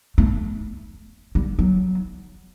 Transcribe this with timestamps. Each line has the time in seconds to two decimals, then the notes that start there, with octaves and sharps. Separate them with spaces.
0.18 A3
1.35 G3
1.59 F#3